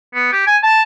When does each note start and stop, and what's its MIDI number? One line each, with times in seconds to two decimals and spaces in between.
0.15 0.32 59
0.32 0.43 67
0.47 0.57 80
0.63 0.82 81